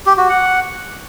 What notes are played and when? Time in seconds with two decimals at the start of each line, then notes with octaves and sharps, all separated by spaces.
0.06 G4
0.18 F#4
0.29 F#5